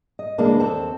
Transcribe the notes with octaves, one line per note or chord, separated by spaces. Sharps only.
D#5
D2 C#3 E3 G#3 A#3 D4
D#2 C4 A4